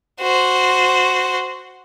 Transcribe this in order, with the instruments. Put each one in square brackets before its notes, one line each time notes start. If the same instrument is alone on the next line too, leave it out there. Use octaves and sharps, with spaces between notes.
[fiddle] F#4 C5